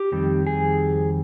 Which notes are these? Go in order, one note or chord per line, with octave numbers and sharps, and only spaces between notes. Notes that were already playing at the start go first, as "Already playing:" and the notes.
Already playing: G4
F2 D#3 G3 C4
G#4